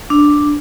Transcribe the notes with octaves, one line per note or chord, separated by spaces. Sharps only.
D4